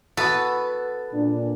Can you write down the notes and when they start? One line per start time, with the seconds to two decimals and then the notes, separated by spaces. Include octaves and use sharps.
0.17 B3 F#4 A4 B4
1.13 A#2 D4